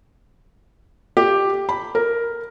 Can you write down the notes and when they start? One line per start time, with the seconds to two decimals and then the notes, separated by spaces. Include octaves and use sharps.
1.17 G4
1.69 B5
1.95 A#4